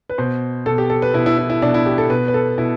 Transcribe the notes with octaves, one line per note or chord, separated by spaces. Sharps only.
B4
B2 C5
B2 A4
G4
A4
B4
B2 E4
E4
E4
E4
B2 D4
E4
G4
A4
B2 B4
B4
A4
B2 E4